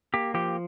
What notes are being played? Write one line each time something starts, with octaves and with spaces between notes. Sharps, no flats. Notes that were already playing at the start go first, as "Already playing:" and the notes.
A#3 G4
F3 G4